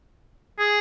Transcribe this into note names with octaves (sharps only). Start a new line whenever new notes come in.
G#4